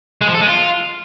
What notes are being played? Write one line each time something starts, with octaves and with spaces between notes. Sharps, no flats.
G#3
F3
A4
G#3
F4